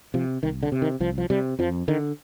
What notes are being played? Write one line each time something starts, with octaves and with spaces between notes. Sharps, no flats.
C3 F3
C2 D#3
D3
C3
D#3
C2 F3
F3
C3 G3
F2 F3
D3 D#3